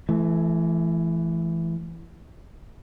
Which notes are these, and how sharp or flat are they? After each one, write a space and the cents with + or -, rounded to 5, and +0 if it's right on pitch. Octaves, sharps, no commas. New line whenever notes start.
E3 +15 A3 -30